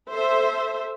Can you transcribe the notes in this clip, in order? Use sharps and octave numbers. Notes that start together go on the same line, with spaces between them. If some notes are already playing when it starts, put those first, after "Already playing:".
A4 C5 E5